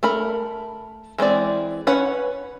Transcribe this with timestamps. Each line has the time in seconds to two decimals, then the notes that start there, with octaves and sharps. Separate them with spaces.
0.03 A3 A#4 B5
1.18 E3 G#3 C4 D5
1.87 C#4 B4 C#5 F#5